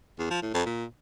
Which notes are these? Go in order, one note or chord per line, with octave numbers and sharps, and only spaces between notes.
E2
F3
A2
F2
A#2